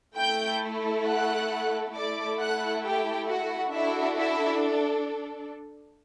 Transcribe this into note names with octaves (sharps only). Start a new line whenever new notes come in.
A3 E4 A4 G5 G6
F#5 F#6
A3 E4 A4 D5 D6
F#5 F#6
G4 G5
F#4 F#5
D4 E4 F#4 A4 E5
E4 E5